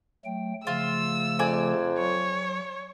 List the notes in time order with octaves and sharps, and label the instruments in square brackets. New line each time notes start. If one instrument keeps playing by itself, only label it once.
[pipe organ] F#3 A3 G5
[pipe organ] C#3 F3 A3 [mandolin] F4 [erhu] E6
[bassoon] F2 [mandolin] D5 G#5
[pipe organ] F#3 [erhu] C#5